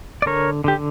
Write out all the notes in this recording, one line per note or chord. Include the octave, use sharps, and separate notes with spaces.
D5
D3 A#4 C#5
D3 G4